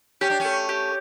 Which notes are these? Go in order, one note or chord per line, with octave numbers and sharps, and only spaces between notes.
C#4 G4
D4
A3 C#4
G4